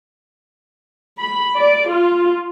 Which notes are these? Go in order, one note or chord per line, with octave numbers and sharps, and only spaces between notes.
B5
D5
F4